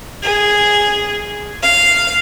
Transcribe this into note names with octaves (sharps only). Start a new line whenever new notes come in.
G#4
F5